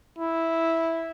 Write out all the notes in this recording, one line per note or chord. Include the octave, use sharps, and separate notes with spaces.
E4